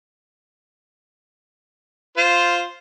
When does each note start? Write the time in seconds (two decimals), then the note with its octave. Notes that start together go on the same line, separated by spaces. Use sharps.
2.17 F4 C5